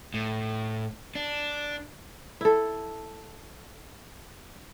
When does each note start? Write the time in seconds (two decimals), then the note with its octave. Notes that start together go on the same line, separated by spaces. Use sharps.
0.14 A2
1.15 D4
2.41 E4 A4